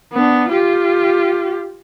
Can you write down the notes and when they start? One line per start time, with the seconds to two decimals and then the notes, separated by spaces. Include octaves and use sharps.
0.13 B3 D4
0.49 F4 G4